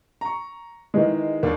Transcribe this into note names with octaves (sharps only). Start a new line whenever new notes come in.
A#5 C#6
D#3 E3 G#3
D#2 A#3 D4